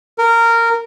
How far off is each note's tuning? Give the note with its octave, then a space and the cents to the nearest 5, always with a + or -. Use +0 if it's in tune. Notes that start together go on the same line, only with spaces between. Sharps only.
A#4 -15